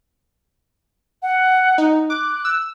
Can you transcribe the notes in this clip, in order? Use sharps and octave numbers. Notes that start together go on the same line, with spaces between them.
F#5
D#4
D6 F#6
E6